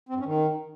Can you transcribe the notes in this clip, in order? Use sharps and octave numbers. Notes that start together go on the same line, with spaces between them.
C4
G2
C#4
D#3